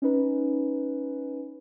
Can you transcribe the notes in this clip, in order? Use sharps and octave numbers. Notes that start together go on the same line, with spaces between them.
C#4 D#4 B4